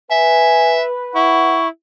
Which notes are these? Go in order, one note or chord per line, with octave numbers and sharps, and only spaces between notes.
B4 E5 G#5
E4 F#5 C#6